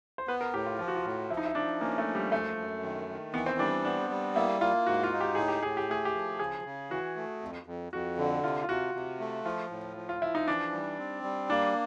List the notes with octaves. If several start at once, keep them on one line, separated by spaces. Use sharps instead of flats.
C5
B3 B4
A#4
A2 G4
F4
F3 F4
F#4
F4
A2
F3 E4
D#4
E4
F3 D4
A#3 C#4
A3
F3
G3
F#2 A3
F#2
D#3
D#3
E3 B3
C4
G3 D4
B3 D4
G3
A#3 E4
A#3 F4
G#2 F#4
F4
D#4
G4
A2 G#4
G4
A2 G#4
G4
A3 G#4
G4
F3
C#3 G#4
C#3
E3 F#4
A3
F2
F2
F2 F#4
D3
C3 F4
F4
C3 F#4
C3
A3
F3 F4
A2
F3
F4
F3 E4
D#4
E3 D4
G3
C4
G3
A#3 D4